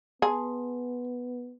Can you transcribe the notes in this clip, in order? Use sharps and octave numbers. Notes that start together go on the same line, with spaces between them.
B3 G#4 G#5 A5 C6